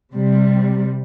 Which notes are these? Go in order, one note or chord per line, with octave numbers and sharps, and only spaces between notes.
C3 G3